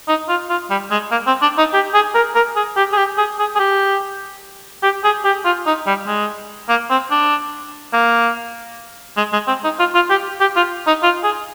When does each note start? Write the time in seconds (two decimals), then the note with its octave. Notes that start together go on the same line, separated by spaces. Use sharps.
0.08 D#4
0.29 F4
0.50 F4
0.70 G3
0.91 G#3
1.11 A#3
1.27 C4
1.42 D4
1.58 D#4
1.74 G4
1.94 G#4
2.15 A#4
2.35 A#4
2.56 G#4
2.77 G4
2.93 G#4
2.97 G4
3.18 G#4
3.39 G#4
3.56 G#4
3.59 G4
4.83 G4
5.04 G#4
5.25 G4
5.45 F4
5.66 D#4
5.87 G3
6.07 G#3
6.69 A#3
6.90 C4
7.11 D4
7.93 A#3
9.17 G#3
9.33 G#3
9.48 C4
9.64 D#4
9.79 F4
9.95 F4
10.10 G4
10.41 G4
10.56 F4
10.87 D#4
11.03 F4
11.24 G#4